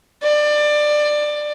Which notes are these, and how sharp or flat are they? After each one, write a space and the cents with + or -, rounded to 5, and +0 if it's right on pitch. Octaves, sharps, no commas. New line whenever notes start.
D5 +20